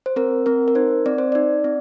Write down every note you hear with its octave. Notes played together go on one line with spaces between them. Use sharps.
C5
C4 A#4
C4 A#4
A#4
D#4 C5
C4 D5
C5
D#4 D5
C4